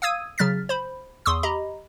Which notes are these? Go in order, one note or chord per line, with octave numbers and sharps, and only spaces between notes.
F5 D#6 E6 G#6 D#7
C#3 F#3 F6 A6 B6
C5 B5
E2 C6 C#6 D#6 E6
G4 D#5 A#5 B5